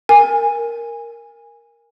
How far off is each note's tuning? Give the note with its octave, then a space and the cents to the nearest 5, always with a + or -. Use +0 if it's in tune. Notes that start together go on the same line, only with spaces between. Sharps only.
A#4 +0 G#5 -15